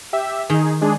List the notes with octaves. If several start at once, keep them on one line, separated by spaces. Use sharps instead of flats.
G4 E5
D#3 D#4 G#4
G#3 D4 G#4